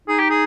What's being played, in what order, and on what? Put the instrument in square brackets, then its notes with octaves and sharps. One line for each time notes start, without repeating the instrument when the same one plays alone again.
[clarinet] D#4 [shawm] G#4
[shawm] G4
G#4